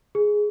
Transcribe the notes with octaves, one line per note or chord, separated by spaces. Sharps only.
G#4